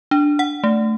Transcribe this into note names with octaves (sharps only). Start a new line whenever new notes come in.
D4
F#5
A3